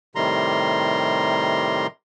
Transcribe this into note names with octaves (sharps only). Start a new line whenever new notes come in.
A2 C3 D#3 G3 A#5 C6